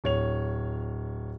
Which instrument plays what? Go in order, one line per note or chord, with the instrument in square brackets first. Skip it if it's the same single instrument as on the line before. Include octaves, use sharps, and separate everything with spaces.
[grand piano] D1 C#5 F7